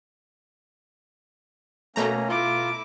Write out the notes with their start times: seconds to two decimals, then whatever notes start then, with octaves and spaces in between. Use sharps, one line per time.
1.96 B2 A3 A#3 C#4 A#5
2.28 E4 F4 D6